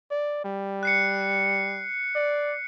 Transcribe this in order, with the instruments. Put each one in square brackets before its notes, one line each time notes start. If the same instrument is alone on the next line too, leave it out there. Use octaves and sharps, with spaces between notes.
[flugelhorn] D5
G3
[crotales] F#6 C7 C#7
[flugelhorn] D5